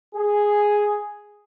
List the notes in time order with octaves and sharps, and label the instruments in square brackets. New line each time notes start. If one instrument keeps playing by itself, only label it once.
[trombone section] G#4